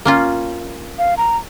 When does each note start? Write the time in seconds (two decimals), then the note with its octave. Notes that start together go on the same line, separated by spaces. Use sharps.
0.05 A#3 C#4 F4
0.98 F5
1.17 A#5